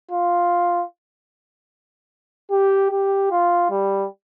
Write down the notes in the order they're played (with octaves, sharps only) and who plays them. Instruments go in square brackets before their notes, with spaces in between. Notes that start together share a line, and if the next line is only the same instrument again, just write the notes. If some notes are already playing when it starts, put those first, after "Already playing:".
[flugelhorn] F4
G4
G4
F4
G3